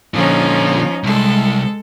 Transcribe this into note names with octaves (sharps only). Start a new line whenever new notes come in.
A#2 D3 F3 C#4 D#4
C2 G#3 A4